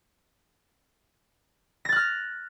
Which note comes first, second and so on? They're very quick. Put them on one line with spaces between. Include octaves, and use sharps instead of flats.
A#6 A6 F#6 F6